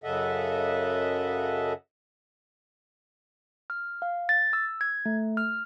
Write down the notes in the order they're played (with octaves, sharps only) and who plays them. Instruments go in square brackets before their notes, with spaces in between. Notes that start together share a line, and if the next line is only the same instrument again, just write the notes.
[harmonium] F#2 C#3 A4 D#5 E5 F#5
[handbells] F6
F5
A6
E6
G#6
A3
F6